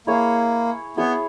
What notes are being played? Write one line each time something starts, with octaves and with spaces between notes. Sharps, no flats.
A#3 E4 G#4 C#5
B3 E4 G#4 C#5